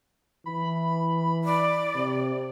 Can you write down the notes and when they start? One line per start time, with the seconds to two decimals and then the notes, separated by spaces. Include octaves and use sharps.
0.46 E3 B5
1.44 D5
1.95 C3